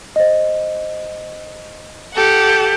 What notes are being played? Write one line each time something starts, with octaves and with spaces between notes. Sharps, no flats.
C5 D#5
G4 A4 F#5